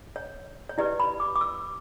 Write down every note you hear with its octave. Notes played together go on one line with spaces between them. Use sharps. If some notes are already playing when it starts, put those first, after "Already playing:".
C#5
C#5
E4 G4 B4 D5
B5
D6
D6
E6